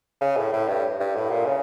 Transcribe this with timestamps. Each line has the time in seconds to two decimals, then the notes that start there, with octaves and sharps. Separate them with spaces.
0.21 C#3
0.37 A2
0.53 A2
0.68 G2
1.00 G2
1.16 A2
1.30 A#2
1.46 C#3